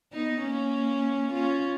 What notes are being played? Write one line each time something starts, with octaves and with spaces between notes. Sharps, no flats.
B3 D#4
A#3 C#4
C#4 F4